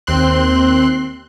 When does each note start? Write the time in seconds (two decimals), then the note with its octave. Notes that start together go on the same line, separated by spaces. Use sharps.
0.07 D#2 C4 C6 F#6